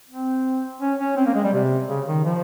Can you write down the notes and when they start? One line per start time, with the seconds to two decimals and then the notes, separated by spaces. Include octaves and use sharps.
0.09 C4
0.81 C#4
0.99 C#4
1.17 C4
1.26 A#3
1.34 G#3
1.44 G3
1.53 C3
1.89 C#3
2.07 D#3
2.25 F3